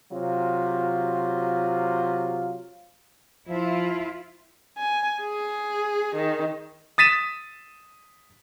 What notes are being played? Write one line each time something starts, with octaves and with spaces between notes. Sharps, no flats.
C3 F#3 F4
F3 E4 F4
G#5
G#4
D#3
D#6 A6 B6 D#7 E7